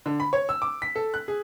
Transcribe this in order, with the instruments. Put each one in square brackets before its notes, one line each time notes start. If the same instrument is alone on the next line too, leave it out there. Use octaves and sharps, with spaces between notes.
[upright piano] D3
B5
C#5
E6
D6
B6
A4
F#6
G#4